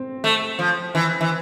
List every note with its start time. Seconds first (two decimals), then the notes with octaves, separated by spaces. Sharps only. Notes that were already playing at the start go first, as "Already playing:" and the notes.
Already playing: C4
0.24 A3
0.59 F3
0.95 E3
1.21 E3